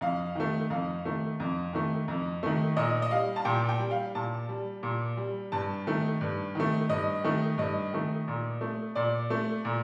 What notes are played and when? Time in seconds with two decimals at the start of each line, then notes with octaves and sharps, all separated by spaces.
0.01 F2 F5
0.35 D#3 A3
0.70 F2 F5
1.05 D#3 A3
1.40 F2
1.73 D#3 A3
2.08 F2
2.43 D#3 A3
2.76 A#2 D#5
3.02 D#5
3.11 G3 F5
3.36 A5
3.45 A#2 G5
3.69 G5
3.79 G3
3.91 F5
4.15 A#2 A5
4.49 G3
4.83 A#2
5.17 G3
5.52 G2 A5
5.87 D#3 A3
6.21 G2
6.55 D#3 A3
6.89 G2 D#5
7.24 D#3 A3
7.58 G2 D#5
7.93 D#3 A3
8.28 A#2
8.61 A3
8.95 A#2 D5
9.30 A3
9.65 A#2